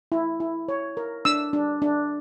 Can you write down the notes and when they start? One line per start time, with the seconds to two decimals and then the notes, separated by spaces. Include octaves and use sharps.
0.12 E4
0.40 E4
0.69 C#5
0.97 A#4
1.25 D4 E6
1.53 D4
1.82 D4